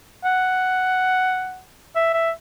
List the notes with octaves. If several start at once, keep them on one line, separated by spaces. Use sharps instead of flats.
F#5
E5
E5